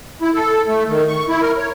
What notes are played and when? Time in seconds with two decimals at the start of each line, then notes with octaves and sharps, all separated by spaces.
0.22 E4
0.34 A4
0.67 A3
0.88 D#3
1.08 C#6
1.28 E4
1.42 A#4
1.57 C#5